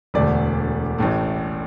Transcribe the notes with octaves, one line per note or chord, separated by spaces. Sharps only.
E1 D2 D3 A3 D5
A1 A2 A3